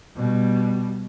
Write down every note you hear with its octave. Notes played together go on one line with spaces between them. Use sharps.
B2 G3